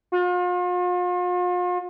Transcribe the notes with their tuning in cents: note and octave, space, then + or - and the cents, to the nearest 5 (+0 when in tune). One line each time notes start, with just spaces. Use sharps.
F4 +40